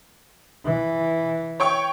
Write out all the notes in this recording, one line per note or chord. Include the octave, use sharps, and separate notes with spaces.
E3
C#5 G5 C#6